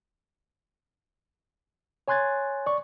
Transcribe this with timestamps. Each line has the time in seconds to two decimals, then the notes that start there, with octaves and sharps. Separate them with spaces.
2.08 C#5 G#5 C6 F#6 G#6 A6
2.66 D5 C#6